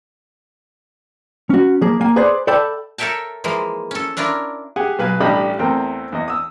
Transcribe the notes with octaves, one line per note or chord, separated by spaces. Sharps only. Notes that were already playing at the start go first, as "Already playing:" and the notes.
C#4 F#4
F3 A#3 G#4
A#3 G#5
G#4 B4 C5 D5
A4 D5 E5 G5 A5 B5
A4 A#4 C#5 E5 G5 A5
E3 F3 G#3 A#3
C#4 A4
C#4 D4 E4 F4 A#4
G4 G#4 F#5 G#5
B1 B4 F5 G#5
A1 G3 D4 G4 D#5 B5
E2 A3 C4 A#4 G5
E2 D#5
D#6 E6